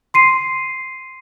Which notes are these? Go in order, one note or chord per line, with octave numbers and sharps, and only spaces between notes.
C6 C7 D#7